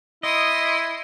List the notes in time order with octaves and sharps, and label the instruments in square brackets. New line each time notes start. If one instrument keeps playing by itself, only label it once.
[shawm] E4 [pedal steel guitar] D#5 [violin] C6 D#6